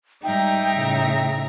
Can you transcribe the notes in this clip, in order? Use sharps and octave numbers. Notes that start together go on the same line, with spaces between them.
G#2 G3 D#4 E5 G5 A#5
A2 C#3